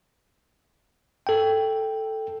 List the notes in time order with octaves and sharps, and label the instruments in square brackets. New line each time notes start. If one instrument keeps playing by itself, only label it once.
[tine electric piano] A4 G5